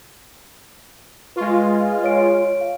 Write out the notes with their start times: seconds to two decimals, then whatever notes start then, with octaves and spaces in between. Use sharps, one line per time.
1.36 G#3 F4 B4 C#6
2.04 C#5 D7
2.61 F5